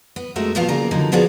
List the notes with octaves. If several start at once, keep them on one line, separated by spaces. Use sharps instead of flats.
B3
F2 G#3 A3 F#4 A#4 E5
E2 A#2 F3 B3 F4 F5
C#3 F#3 A#3 A#4 D5 A#5
D3 F3 F#3 A#3 D#4
F3 B3 F#4 G#4 D5 F5